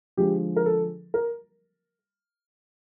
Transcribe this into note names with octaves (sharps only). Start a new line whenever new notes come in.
D3 F3 G#3 G4
A#4
A4
A#4